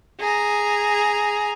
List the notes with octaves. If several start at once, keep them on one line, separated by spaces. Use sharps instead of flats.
G#4 A#5